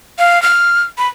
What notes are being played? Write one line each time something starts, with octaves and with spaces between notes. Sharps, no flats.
F5
F6
B5